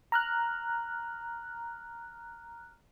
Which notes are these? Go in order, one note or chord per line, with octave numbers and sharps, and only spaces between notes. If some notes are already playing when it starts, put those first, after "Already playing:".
A#5 F6 F#6